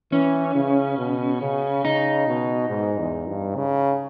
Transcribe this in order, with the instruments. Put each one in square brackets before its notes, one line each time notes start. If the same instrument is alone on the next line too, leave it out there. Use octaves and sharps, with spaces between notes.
[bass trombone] E3 [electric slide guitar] C#4
[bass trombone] C#3
B2
C#3
[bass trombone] C#3 [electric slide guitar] D#4
[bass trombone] B2
G#2
E2
G2
C#3